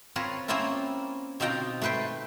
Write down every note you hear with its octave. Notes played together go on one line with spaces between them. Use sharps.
C4 F4 A#4 B4 C#5
A#3 C4 C#4 E4 F4 A#4
B2 C4 D#4 F4 G5 A#5
A3 A4 B4 C5 G5